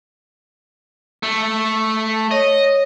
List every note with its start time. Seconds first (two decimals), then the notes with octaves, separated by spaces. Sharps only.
1.23 A3
2.31 C#5 D#5